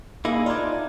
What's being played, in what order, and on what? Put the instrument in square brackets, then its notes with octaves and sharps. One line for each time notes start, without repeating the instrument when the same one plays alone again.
[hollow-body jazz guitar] A#3 G#4 [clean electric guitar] D#4 E4
[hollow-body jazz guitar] D4 F4 [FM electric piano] D5 A#5 G#6